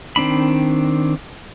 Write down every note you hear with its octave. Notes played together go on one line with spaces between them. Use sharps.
D#3 C4 D4 B5